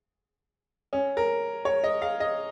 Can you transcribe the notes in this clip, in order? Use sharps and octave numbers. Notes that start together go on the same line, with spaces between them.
C#4
A#4
C#5
D#5
F5
D#5